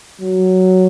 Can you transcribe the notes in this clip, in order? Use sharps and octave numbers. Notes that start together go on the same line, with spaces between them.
F#3